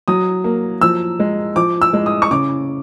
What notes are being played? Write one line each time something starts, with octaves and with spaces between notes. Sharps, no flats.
F#3 D#6
A#3
F3 E6
G#3
F3 D6
E6
G#3
D#6
C#6
C#3 D6